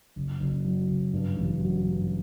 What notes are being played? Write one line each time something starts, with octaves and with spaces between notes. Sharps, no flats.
F#1
F#1
F#3
F#1
G2
A1
F#3
G2